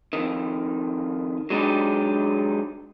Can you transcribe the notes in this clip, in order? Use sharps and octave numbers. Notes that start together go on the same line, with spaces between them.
F2 D#3
F#3 G#3 D4 D#4 G4